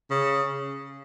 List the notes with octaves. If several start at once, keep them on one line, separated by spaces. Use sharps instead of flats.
C#3